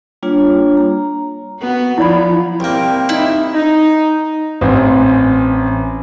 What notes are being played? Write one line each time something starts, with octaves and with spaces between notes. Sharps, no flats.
G3 A#3 D4 F4 C#5
A#5
B3 F#4
F3 E4 D5 B5
C2 A#3 G5
D#4 E4
D#4
A1 C4